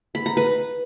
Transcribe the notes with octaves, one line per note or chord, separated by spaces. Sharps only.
B5
A#5
B4